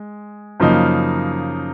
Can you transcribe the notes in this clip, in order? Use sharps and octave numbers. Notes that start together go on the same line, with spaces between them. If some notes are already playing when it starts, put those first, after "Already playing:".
Already playing: G#3
F#2 C#3 F3 A#3 D#4